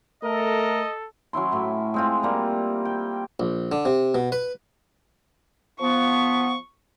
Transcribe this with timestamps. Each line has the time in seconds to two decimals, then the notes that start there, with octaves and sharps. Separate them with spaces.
0.23 A3 A4 A#4 D#5
1.33 F#3 C#4 E4 C6
1.52 A2 E4
1.94 G#3 C4 F4
2.23 G3 A#3
2.85 G5
3.40 A#1
3.72 D3
3.85 C3
4.15 B2
4.32 B4
5.80 F3 B3 C#6